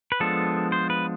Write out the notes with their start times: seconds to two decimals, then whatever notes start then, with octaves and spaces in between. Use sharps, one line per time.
0.12 B4
0.20 F3 G#3 B3 D4 A4
0.72 C5
0.90 B4